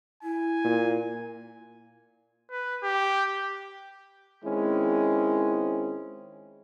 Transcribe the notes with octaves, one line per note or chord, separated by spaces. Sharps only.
E4 G#5
A#2
B4
G4
D#3 G#3 C4 C#4 E4